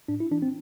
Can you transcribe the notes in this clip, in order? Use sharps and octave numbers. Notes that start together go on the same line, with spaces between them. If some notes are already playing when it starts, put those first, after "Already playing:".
A2 D4
E4
E3 D4
C4